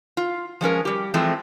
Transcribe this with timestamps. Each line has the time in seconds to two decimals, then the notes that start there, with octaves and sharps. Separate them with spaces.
0.17 F4
0.61 F3 G#3 C#4 A#4
0.85 G3 G4
1.14 E3 F3 G#3 A3 C4